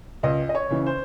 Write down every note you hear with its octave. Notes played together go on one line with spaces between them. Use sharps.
C#2 D#5
D#5
C#5
C#3 E3
C5